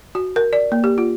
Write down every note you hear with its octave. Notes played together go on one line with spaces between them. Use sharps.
F#4
A#4
D5
A#3
G4
F4